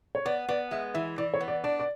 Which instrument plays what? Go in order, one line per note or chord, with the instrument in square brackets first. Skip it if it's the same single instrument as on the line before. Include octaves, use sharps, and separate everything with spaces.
[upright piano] C#5
[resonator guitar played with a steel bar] B3 [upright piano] D5
[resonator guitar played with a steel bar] B3 [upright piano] D5
[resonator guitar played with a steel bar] G#3 [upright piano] E5
[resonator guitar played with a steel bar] E3 [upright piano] E5
[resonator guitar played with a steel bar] E3 [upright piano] D5
[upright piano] C#5
[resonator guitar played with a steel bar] B3
[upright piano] D5
[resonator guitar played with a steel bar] D4 [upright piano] D5
[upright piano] D5